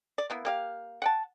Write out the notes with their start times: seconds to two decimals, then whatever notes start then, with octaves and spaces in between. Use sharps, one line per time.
0.18 D5
0.30 A#3 B3 E4
0.45 A#3 G4 F5
1.02 F#5 G5 A5